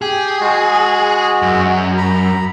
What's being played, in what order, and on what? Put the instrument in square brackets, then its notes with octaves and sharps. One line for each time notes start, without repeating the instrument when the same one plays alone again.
[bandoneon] G4 G5 [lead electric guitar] G#4
[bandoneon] G#3 F#4
[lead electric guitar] F#2
[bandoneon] A#5 B5